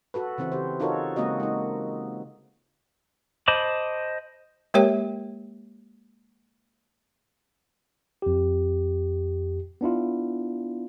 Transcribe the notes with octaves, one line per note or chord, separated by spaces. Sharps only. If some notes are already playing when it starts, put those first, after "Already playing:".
F#4 A4 B4
C#3 E3 C4 E4
G4 C5
D#4 F4 F#4 A4 A#4 C#5
C#3 G#3 A#3 C4 F#4 D#5
G#3 D#4
C5 D#5 A5 B5 D6
G#3 A#3 G4 A#4 C#5 G5
F2 G4
B3 D4 E4 F4